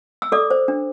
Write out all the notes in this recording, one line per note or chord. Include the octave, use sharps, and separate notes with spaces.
E6
A4 D5 D6
C5
D4